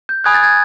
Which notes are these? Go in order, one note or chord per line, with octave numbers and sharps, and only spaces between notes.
G6
G#5 B5 D#6 F#6 G#6
A6
G#6